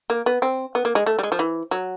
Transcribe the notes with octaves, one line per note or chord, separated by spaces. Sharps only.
A#3
B3
C4
B3
A#3
G#3
A3
G3
G#3
F3
E3
F#3